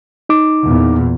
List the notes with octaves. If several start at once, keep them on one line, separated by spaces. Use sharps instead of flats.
D#4 D6
E2 A#2